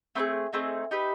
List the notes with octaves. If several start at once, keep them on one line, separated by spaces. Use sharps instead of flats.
A3 C4 D#4 G#4
A3 C4 D#4 G#4
D#4 G4 B4 E5